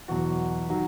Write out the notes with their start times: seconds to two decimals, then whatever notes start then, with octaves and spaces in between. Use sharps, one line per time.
0.08 E2 B2 F#3 F#4
0.69 D#3 F#3